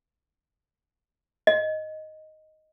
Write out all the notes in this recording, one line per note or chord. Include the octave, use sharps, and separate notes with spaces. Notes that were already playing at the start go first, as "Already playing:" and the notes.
D#5